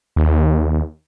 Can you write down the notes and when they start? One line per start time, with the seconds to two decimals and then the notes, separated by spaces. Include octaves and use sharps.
0.16 D#2